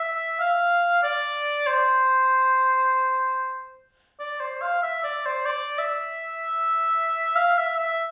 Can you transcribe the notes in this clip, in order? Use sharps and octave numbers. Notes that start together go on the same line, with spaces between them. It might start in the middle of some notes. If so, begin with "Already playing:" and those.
Already playing: E5
F5
D5
C5
D5
C5
F5
E5
D5
C5
D5
E5
F5
E5
E5